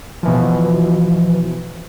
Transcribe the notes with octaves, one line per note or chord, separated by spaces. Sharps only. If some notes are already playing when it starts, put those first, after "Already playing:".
B2 E3 F3